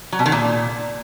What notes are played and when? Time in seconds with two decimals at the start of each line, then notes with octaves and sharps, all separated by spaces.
0.12 F#3
0.19 B2
0.26 D#3
0.32 A#2